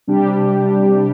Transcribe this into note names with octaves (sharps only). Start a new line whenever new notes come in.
C3 G3 D4 G4